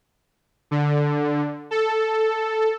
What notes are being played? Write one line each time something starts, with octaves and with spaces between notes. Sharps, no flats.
D3
A4